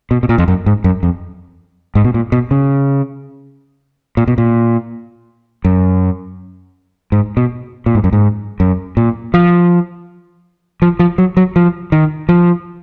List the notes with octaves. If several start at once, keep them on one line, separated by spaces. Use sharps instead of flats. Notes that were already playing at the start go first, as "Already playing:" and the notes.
B2
B2
A#2
F2
F#2
G#2
F#2
F2
G#2
B2
A#2
B2
C#3
A#2
B2
A#2
F#2
G#2
B2
A#2
G#2
F#2
G#2
F#2
A#2
F3
F3
F3
F#3
F#3
F3
D#3
F3